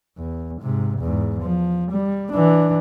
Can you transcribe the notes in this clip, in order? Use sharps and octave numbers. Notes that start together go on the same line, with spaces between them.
E2
G#2 C3
E2 G#2
F3
G3
E3 D4